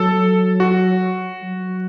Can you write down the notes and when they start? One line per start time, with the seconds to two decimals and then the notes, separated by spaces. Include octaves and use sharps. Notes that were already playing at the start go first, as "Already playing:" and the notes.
Already playing: F#3 A4
0.60 F#4
1.42 F#3